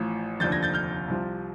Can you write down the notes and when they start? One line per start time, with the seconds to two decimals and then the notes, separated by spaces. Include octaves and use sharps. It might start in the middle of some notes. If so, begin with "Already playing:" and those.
Already playing: A1 A2 F3
0.40 F1 D#2 D3 F3 G6 A6
0.52 G#6 A#6
0.62 G6 A6
0.74 F6 G6
1.08 C2 C3 F3